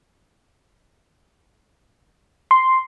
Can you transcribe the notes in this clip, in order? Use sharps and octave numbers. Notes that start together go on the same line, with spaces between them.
C6